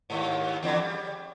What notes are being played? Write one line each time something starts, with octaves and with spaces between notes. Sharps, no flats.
D#2 G#2
E2 D3 E3
G3